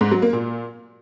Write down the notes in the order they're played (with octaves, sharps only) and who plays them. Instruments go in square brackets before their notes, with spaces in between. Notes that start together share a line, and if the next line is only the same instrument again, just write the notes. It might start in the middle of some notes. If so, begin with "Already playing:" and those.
[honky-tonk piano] G#2
F#3
A#3
A#2